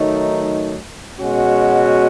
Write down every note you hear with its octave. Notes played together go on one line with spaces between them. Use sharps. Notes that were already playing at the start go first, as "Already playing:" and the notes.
Already playing: D#3 F#3 A3 D#4
B2 G#3 C#4 F#4